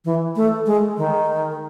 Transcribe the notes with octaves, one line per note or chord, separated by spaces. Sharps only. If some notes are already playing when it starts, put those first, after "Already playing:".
E3
A3
G#3
D#3